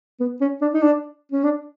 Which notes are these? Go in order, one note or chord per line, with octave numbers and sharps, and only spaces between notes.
B3
C#4
D4
D#4
D4
C#4
D4